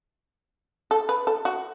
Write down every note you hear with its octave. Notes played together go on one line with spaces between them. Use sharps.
A4
B4
A4
F#4